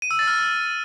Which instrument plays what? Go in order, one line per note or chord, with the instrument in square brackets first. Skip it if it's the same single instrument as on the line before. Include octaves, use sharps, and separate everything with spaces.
[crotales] D#7
E6
A6
F6